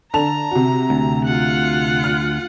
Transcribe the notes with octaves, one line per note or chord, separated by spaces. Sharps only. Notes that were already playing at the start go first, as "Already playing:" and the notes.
D3 A5 A#5 F7
C3 F#4
D2
F4 F#5
F6